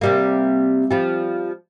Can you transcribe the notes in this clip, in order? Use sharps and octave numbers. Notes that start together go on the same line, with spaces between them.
C3 G3 A#3
F3 G3